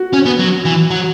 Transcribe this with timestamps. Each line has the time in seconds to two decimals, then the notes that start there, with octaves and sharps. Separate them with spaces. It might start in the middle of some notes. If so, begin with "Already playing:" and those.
Already playing: F#4
0.13 C#4
0.26 B3
0.39 F#3
0.65 E3
0.91 F#3